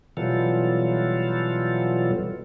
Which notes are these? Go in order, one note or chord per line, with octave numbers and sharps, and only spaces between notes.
B2 E3 F#3 G3 F4 A4